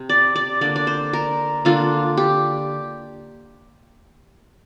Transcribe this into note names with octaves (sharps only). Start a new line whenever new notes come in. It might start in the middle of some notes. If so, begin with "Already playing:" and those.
Already playing: C3 C4
D5
D5
D3 A#3 D4 D5
D5
C5
A#4
D3 A#3 D4 F4
G4